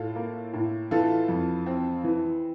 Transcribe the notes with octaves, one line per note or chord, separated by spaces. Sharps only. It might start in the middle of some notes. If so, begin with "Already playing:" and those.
Already playing: A2 F4 A4
A#3
A2
E3 F4 A4
F2
C4
E3